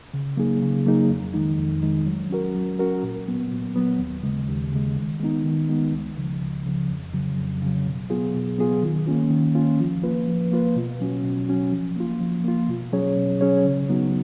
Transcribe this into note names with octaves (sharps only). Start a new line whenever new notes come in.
C#3
F#3 A#3 D#4 G#4
C#3
F#3 A#3 D#4 G#4
F2
D#3 G#3 D#4
F2
D#3 G#3 D#4
F#3
C#4 F#4 A#4
F#3
C#4 F#4 A#4
A#2
F#3 B3
A#2
F#3 B3
D#2
C#3 G#3
D#2
C#3 G#3
D#3
G#3 B3 D#4
D#3
G#3 B3 D#4
C#2
C#3 F3
C#2
C#3 F3
F2
C#3 F#3
F2
C#3 F#3
B2
F#3 B3 F4 G#4
B2
F#3 B3 F4 G#4
D#3
A#3 C#4 F4
D#3
A#3 C#4 F4
F3
A#3 F4 B4
F3
A#3 F4 B4
B2
F#3 C#4 F#4
B2
F#3 C#4 F#4
F3
A#3 F4
F3
A#3 F4
B2
F#3 C#4 G#4 C#5
B2
F#3 C#4 G#4 C#5
C#3
F#3 B3 D#4 F#4